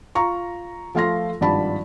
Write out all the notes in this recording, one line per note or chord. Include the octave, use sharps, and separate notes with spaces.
F4 A#5 C#6
F3 A3 F4 F5 C6 A#6
G#1 G2 F3 D5 A5 B5